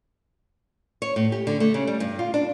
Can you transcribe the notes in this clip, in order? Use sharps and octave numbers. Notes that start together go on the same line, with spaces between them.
C#5
A2
G4
D3
A3
C#3
G3
G2
F4
D4